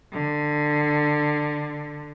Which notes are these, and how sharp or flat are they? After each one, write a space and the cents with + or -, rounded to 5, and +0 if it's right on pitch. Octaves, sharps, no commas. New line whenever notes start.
D3 +15